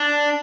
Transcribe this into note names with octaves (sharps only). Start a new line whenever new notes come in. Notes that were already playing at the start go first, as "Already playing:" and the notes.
Already playing: D4